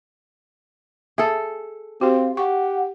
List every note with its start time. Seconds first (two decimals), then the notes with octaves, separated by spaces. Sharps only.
1.18 G#4 A4 E5
2.01 C4 F#4 G4 F5
2.37 G4 F#5 C#6